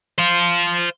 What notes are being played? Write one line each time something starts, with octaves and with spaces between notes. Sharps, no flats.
C5 F5